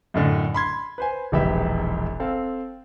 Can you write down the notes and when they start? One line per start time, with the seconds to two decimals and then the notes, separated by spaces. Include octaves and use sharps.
0.14 F#2 A2 D3 D#5
0.54 B5 C6 G#6
0.98 B4 C5 G#5
1.32 E1 A#1 D#4 G4 B4 E5
2.20 C4 A4 F5